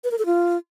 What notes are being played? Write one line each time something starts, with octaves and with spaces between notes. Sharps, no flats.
B4
A#4
A4
F4